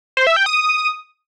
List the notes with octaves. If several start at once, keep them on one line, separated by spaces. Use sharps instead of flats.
C5
E5
G5
D#6